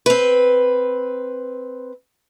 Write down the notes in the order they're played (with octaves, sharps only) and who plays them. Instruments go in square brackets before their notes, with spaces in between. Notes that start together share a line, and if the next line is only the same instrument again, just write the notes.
[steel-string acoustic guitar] C4 B4